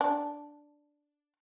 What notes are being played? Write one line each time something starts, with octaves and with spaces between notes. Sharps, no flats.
D4